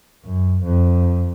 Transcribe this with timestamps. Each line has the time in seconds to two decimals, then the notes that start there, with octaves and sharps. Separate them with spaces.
0.25 F#2
0.64 F2